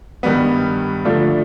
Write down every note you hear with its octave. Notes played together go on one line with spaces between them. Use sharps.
G2 D#3 G3 B3
D3 F3 A3 D4 F4